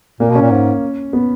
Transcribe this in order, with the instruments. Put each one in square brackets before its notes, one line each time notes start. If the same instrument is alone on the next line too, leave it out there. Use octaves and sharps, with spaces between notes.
[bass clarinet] A#2 [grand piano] A#3
[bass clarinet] B2
[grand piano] C#4
[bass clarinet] A#2
G#2
[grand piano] B3